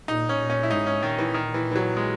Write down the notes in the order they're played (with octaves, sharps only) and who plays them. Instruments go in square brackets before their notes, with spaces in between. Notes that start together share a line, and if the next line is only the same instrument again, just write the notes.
[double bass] A#2 [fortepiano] D#4
[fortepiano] C#4
[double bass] A#2
[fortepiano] C#4
E4
[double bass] G#2 [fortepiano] D#4
[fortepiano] C#4
[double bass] A#2 [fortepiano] D#3
[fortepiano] E3
D#3
E3
E3
F#3
G#3